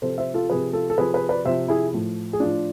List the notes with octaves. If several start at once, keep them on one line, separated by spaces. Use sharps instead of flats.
C3 F3 A4 C5
C5 E5
F4 A4
C3 F3 G#4 B4
F4 A4
A4
C3 F3 G#4 B4
G#4 B4
B4 D5
C3 F3 C5 E5
E4 G#4
A2 F3
G#4
A2 F3 D4 F4